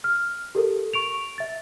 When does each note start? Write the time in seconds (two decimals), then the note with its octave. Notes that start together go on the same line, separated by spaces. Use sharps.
0.04 F6
0.55 G4 A4 A#4
0.93 C#6 D7 F7
1.38 E5 A6